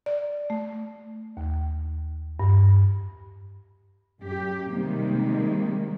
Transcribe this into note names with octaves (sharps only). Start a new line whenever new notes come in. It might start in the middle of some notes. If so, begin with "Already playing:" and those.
D5
A3
D#2
G2
F#2 G4
C3 D#3 G3 G#3 A#3